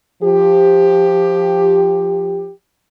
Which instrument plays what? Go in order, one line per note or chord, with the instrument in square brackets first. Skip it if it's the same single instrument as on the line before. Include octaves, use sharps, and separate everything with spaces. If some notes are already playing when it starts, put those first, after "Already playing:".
[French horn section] F3 G4